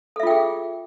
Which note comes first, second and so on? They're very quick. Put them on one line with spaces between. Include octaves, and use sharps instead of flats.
A4 E5 F4 G5 G#4